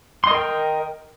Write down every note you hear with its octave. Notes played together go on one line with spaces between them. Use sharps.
A#4 D#5 G5 C6